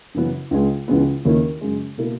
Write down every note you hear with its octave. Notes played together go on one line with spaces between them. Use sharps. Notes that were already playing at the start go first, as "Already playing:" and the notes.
F#2 C#3 E3 B3
C#2 C#3 G#3
C#2 C#3 E3 G#3 B3
D#2 D#3 A#3 C#4 E4
F#2 C#3 G#3
B2 A#3 E4